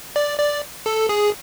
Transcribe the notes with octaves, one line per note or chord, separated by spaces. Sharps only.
D5
D5
A4
G#4